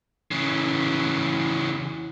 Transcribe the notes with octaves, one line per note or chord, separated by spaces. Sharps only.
C#3 E3